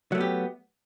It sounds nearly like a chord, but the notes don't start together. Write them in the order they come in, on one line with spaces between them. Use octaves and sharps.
F#3 A3 B3 G4